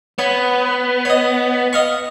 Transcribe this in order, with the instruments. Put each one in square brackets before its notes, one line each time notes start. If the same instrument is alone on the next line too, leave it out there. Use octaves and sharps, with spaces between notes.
[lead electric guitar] B3 [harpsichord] C#5
[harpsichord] C#5 D#5
D#5 F5 C#6